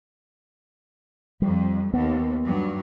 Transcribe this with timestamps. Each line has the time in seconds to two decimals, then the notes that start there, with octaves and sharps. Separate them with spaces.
1.42 F2 G3
1.94 D#2 B3
2.45 G2 F#3